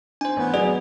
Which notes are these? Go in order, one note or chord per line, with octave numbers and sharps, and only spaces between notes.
D4 C5 G#5
A1 B3
F#3 G#4 D5 G#5